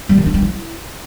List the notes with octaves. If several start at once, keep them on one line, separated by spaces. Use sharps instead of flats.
G3
D#3
D4
G3
E4